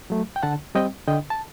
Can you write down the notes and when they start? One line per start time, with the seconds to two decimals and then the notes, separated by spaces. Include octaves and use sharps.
0.10 F#3 A3
0.36 G5
0.43 D3 F#5 A5
0.75 G3 C4 D#5 G5
1.08 D3 D#5 G5
1.30 A5